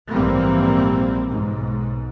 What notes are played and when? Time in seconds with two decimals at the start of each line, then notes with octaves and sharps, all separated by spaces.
0.11 A#1 G#2 E3 G3 A#3 C4
1.28 B1 G#2